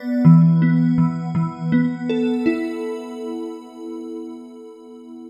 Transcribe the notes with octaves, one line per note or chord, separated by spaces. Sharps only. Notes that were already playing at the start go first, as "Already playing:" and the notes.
Already playing: B3 D5
E3
B3
E3
E3
B3
A4
E4